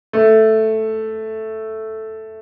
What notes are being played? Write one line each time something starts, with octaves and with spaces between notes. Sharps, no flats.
A3